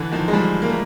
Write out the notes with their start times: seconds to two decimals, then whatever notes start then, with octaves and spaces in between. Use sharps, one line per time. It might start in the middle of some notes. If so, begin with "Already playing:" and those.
Already playing: D3 E3
0.12 D#3 F3
0.28 G#3
0.33 F3 G3
0.62 A#3
0.69 A3